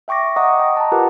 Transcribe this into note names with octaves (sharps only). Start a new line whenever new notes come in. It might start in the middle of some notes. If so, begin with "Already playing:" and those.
E5 G5 C#6 D6 A#6
D#5 F#5 A#5 C#6 D#6
D#5 G5
A5 A#5
F4 G4 A#4 B4 F#5